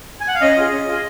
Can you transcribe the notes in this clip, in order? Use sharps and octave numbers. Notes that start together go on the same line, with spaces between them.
G#5
F#5
F5
C#4 D#5
F4 G#4
C#4
F4 G#4